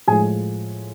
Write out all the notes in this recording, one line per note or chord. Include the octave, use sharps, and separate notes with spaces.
A2 F3 G#3 G#4 G#5